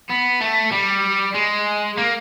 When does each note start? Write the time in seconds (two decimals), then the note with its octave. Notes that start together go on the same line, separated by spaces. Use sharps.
0.09 B3
0.41 A3
0.72 G3
1.35 G#3
1.97 A#3